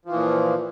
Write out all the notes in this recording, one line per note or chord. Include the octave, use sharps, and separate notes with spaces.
A#2 E3 F3